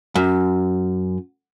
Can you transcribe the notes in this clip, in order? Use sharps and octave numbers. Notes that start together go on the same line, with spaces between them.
F#2